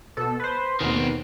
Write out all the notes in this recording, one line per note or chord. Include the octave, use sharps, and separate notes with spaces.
B2 A4
B4 C5
D#2 B2 D#3 C4